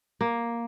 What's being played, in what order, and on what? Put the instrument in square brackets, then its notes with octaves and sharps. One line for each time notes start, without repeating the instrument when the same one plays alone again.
[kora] A#3